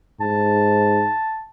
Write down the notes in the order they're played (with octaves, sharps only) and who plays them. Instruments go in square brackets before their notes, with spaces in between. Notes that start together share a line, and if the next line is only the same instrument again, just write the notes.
[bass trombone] G#2 [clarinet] A5